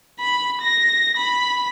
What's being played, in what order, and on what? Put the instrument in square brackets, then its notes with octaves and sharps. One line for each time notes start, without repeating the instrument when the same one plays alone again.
[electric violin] B5
A#6
B5